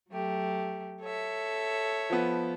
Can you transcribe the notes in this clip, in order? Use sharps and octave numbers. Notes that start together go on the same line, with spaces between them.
F#3 A3 G4
A4 C#5 E5
F3 B3